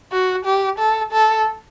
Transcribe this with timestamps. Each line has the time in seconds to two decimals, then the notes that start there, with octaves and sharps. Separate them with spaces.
0.12 F#4
0.46 G4
0.79 A4
1.12 A4